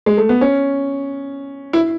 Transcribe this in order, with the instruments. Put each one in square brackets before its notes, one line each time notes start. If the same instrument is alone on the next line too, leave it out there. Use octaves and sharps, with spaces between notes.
[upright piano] G#3
A3
B3
C#4
E4